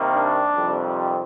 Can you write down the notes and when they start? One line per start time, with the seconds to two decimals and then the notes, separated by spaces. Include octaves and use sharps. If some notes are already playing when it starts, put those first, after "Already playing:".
Already playing: C3 D#3 G3 A#3
0.14 D4
0.56 F2 C3 D#3 G3